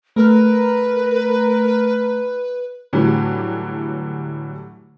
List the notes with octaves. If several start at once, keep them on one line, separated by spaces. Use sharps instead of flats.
A3 A#4 B4 A#5 F6
A2 D3 E3 F#3 G3